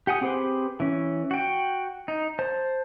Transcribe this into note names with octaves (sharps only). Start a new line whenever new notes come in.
G4 F#5 G#5 D#6
C4 G4 G#4 B4 C5
E3 C#4
F#4 G5
D#4
C5 A5